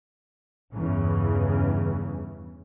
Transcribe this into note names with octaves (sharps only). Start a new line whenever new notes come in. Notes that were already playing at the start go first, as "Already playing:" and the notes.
E2 G2 C#3 E3